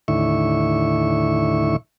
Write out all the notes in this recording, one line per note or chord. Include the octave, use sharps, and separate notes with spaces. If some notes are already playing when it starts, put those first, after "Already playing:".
D#2 A2 D3 E4 E5 C#6